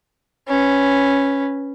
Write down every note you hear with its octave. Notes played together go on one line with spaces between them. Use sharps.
C#4 B4